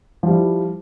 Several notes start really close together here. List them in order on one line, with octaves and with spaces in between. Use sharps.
F3 G3 E4